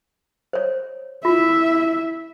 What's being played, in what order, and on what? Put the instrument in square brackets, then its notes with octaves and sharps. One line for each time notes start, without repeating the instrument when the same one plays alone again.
[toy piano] C5 C#5
[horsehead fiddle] E4 E5 [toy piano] F4